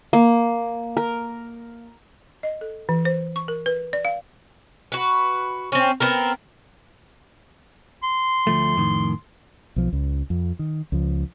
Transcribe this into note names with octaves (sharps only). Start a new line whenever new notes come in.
A#3
A#4
D#5
A4
E3
C5
C#6
A#4
B4
D5
F5
F#4 B4
C4 C#4
B3 C4 A#4
C6
D2 F3 A3
F2 A2 D#3
B1 F3
C#2
F2
D#3
C#2 F3